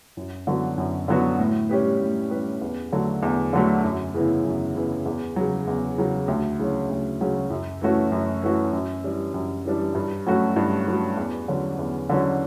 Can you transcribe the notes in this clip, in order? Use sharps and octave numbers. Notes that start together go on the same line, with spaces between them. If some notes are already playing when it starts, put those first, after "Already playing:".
F#2
D3 F#3 B3 F#4
F#2
D3 F#3 B3 F#4
A2
G3 C#4 G4 B4
A2
G3 C#4 G4 B4
E2
D3 F#3 A3
E2
D3 F#3 A3
F#2
C#3 E3 B3 E4
F#2
C#3 E3 B3 E4
E2
C#3 F#3
E2
C#3 F#3
D2
C#3 F#3 C#4
D2
C#3 F#3 C#4
F#2
E3 A3 C#4 F#4
F#2
E3 A3 C#4 F#4
F#2
E3 G3 D4
F#2
E3 G3 D4
G2
F#3 A3 C#4 F#4
G2
F#3 A3 C#4 F#4
E2
D3 F#3 C#4
E2
D3 F#3 C#4